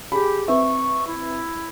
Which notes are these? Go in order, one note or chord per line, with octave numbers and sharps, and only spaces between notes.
G4 G#4 B5
C4 B4 E5 C#6
E4